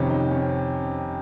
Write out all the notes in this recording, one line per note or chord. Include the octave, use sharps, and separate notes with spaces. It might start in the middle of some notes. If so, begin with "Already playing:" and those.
Already playing: F2 C3 D#3 C#4
D#4
C#4